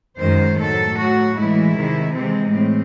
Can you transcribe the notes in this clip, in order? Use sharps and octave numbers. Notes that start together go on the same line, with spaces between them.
F#2 D#3 G#3 C5
A2 F#3 A4
A2 F#3 F#4
A2 E3 G#3 E4
C3 D#3 G#3
C3 E3 G#3 C4
A2 C4